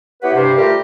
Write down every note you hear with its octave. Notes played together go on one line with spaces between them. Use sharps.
B3 E4 G4 B4 C#5 F#5
G2 C3 C5
G3 A3 F4 G4 A#4